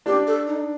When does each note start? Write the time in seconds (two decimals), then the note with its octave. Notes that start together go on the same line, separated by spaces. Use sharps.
0.06 D4 G4
0.27 A4
0.47 D#4